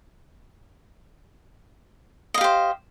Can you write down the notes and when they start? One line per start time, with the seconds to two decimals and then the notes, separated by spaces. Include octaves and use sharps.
2.34 D#5
2.38 F5
2.41 G4
2.44 C5